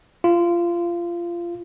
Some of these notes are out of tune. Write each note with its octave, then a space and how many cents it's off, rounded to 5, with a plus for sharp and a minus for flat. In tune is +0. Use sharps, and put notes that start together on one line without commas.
F4 -20